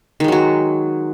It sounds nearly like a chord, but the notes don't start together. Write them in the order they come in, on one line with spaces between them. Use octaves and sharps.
D#3 G#3 F#3 F#4